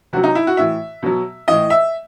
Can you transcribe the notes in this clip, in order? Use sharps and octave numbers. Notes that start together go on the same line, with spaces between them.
C3 F#3 F#4
D#4
E4
F#4
A2 E3 E5
B2 F#3
A2 E3 D#5
E5